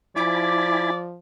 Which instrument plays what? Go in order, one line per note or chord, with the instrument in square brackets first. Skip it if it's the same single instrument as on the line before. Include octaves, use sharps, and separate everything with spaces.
[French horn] F3 [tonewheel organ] E4 G#5 B5 [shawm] D5 [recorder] D6